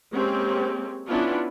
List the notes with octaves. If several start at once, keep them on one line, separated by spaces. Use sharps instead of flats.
G#3 A#3 C4 C#4 G4
B3 C#4 D4 E4 F4